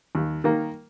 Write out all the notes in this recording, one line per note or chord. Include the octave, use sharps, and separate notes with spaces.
D#2
D#3 A#3